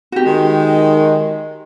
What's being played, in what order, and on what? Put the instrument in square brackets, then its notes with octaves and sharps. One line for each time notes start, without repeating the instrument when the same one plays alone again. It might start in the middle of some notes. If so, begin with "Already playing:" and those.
[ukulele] F#4 G4
[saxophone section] D#3 G#3